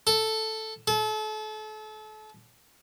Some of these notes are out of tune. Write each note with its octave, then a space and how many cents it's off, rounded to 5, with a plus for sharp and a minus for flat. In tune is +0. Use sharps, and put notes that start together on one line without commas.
A4 +0
A4 -35